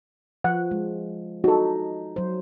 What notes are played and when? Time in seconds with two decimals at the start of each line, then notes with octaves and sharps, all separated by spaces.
0.44 F3 F#5
0.71 G#3
1.44 D#4 F#4 A4
2.16 F#3 C5